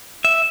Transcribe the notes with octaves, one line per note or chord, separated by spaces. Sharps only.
E5